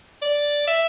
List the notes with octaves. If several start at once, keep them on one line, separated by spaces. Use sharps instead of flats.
D5
E5